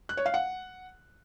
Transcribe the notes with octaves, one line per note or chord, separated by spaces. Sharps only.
F#6
C#5
F5
F#5